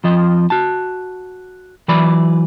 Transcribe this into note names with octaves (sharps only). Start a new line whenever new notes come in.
F2 F3 D#5
F#4 A5
E3 F#3 B4 D5 B5